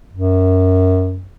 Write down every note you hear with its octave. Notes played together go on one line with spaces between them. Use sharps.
F#2